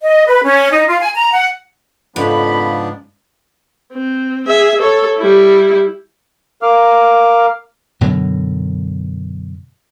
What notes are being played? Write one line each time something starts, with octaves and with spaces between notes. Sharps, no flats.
D#5
B4
C#4
D#4
F4
G#5
A#5
F#5
F2 G#2 C#3 F3 B3 D4 B5
C4
G#4 E5
A4 C#5
G3 E4
A#4 F5 D6 F6
F#2 B2 D3 F#3